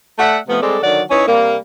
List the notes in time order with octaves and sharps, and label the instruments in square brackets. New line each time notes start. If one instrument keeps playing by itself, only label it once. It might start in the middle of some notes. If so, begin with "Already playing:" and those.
[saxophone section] A3 D5 E5 F#5
C3 F3 A3 B3
G3 G#3 C4 A4 D5
D3 D#3 F#3 D5 F#5
C#4 D#4 E4 B4 C#5
C3 G3 A#3